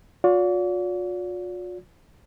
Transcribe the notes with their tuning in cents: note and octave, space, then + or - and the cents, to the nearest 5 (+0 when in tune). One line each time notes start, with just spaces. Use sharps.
F4 +45 D5 -40